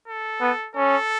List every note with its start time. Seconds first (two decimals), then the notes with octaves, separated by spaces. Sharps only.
0.08 A4
0.41 B3
0.76 C#4 A4